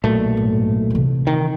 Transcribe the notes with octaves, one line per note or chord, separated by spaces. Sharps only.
B1 A#2 A3
G#2
C3 E3
D#3